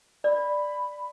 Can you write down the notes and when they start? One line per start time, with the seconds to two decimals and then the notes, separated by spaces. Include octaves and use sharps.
0.24 D5 B5